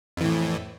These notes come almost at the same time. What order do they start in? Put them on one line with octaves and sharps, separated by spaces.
F2 E3 A2